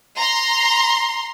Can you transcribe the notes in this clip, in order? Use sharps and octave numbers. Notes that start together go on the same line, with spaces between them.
A#5 C6